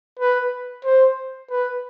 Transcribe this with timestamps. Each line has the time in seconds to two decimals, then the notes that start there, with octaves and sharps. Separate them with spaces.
0.19 B4
0.85 C5
1.50 B4